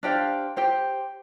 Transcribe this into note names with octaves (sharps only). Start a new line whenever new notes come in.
D4 G4 C5 F5
G4 C5 G5